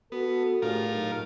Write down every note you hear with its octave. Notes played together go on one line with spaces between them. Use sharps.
B3 F#4 A4
A2 D4 F4 G4 G#4 A#4
A#2 F#3 D#4